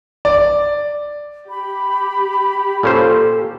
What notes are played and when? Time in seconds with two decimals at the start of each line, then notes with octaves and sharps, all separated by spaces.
0.25 D5
1.50 G4 B5
2.83 A#2 C#4 A4 C5